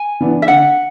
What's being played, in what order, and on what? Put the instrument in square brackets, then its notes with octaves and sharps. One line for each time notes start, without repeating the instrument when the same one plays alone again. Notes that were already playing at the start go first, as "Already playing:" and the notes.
Already playing: [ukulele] G#5
[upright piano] E3 B3 D4
[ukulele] E5
[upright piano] D3 [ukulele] F#5